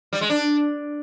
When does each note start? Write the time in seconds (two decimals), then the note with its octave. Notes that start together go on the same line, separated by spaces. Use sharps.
0.13 G3
0.21 G#3
0.30 D4